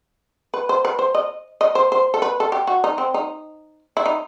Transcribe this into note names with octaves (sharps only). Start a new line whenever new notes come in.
B4
C5
B4
C5
D#5
D#5
C5
C5
A4
B4
A4
G4
F#4
D#4
C4
D#4
E4
D#4